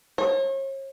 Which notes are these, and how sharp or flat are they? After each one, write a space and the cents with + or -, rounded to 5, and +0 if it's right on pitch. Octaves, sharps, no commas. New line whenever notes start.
C#5 -40